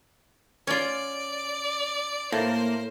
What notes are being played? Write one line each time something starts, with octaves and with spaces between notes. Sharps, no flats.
C#4 F4 D5
A2 A#3 C5